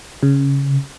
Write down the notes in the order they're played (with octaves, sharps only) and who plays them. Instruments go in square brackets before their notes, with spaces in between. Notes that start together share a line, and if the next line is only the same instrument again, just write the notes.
[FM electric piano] C#3